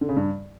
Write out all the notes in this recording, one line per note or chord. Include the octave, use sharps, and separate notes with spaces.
D3
C#3
G2